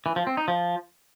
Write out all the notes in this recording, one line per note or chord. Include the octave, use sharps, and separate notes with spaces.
E3
F3
C4
D#4
F3